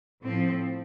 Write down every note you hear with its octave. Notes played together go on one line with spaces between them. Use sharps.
A2 F3 C4